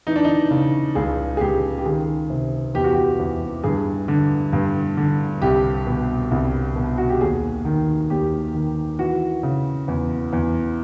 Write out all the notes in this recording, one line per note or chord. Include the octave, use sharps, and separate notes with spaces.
E3 D#4
D4
D#4
C#3
C#2 G#4
G#4
C#2 G4
G4
D#3 G#4
C3
E2 G4
F#4
G4
E2
G2 G#4
D3
G2
D3
C2 G4
B2
C2
B2
F#4
G4
D#2 G#4
D#3
D#2 G4
D#3
E3 F#4
C#3
E2
E2